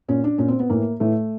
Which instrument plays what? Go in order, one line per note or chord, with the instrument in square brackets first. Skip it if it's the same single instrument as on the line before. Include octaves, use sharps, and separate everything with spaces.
[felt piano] A#2 C#4
D4
A#2 C#4
C4
B3
A2 E3 A#3
A2 E3 A3